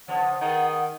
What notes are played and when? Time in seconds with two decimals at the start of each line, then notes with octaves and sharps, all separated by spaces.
0.08 C#3 F3 B3 F#5
0.41 D#3 B3 G#4